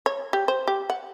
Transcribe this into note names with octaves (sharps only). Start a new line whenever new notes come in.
C#5
G4
C5
G4
F#5